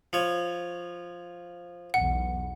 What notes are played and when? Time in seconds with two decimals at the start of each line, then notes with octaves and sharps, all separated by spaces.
0.13 F3 C#5
1.94 B1 E2 F#5